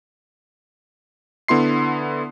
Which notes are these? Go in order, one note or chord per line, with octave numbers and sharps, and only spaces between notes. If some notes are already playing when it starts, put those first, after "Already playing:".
D3 B3 E4 C6 C7